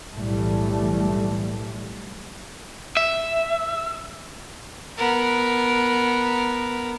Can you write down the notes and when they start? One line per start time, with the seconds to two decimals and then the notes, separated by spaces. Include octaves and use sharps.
0.15 B1 A2 E3 G3 A3
2.97 E5
4.98 B3 A#4